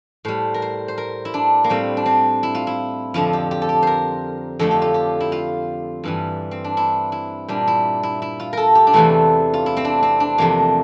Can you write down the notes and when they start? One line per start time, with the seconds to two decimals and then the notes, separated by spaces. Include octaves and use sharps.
0.25 A2 G3 C5
0.54 A#4
0.62 C5
0.88 C5
0.98 A#4
1.25 E4
1.34 D4
1.64 A#3
1.69 A2 G3 C4
1.97 D4
2.06 C4
2.43 E4
2.55 F4
2.67 E4
3.14 F2 D3 F3 F4
3.33 G4
3.51 G4
3.62 A4
3.69 G4
3.82 A#4 C5
4.59 F2 D3 F3 A3 A4
4.71 G4
4.82 F4
4.94 G4
5.20 E4
5.32 F4
6.04 G2 E3 G3
6.51 C4
6.64 D4
6.77 E4
7.12 E4
7.48 A#2 G3 D4
7.67 E4
8.03 E4
8.22 E4
8.40 F4
8.53 A4 A#4
8.75 G4
8.87 D4
8.93 E2 C3 E3 A3 E4
9.54 F4
9.66 E4
9.77 C4
9.85 D4
10.03 C4
10.20 D4
10.38 E2 C3 F3 A3 A#3